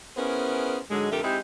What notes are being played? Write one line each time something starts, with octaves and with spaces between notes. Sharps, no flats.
B3 C#4 E4 G#4 A#4 C5
G#2 D3 F#3 G#3
F2 D3 A3 G4 A#4 E5
G#3 C4 D#4 E4 G4 G#4